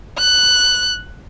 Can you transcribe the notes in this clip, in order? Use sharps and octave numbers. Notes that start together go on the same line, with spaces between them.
F#6